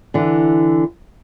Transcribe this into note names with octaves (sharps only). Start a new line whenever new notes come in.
D3 E3